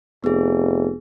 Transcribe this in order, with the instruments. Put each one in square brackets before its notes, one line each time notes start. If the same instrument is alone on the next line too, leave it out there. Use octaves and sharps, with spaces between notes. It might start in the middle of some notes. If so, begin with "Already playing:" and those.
[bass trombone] F1 [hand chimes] B3 G#4